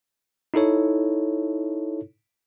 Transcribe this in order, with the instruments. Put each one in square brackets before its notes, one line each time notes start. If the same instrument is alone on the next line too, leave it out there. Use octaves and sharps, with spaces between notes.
[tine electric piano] D#4 E4 A4 C#5